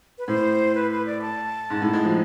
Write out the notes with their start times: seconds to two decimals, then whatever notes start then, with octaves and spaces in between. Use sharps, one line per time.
0.18 B4
0.28 A2 C5
0.75 B4
0.91 B4
1.06 D5
1.22 A5
1.70 G#2
1.82 A2
1.93 G#3
2.05 F3